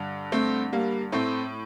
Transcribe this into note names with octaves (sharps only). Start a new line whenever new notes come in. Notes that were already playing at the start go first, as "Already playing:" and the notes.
Already playing: G2 D3
A3 C4
G3 A#3
A2 A3 C4